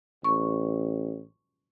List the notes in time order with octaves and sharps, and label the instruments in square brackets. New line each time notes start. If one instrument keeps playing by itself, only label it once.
[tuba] A1 [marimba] C#6